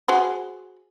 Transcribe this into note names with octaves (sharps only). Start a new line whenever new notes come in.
F#4 G#4 C5